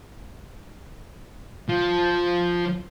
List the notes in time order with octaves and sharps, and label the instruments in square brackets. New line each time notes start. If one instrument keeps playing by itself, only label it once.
[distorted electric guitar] F3